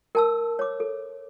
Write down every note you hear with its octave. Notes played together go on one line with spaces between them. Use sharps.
A#4 A5 E6
C#5 D6
A4